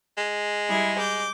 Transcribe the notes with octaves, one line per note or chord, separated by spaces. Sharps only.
G#3
G3 E4 G#4
D6 G6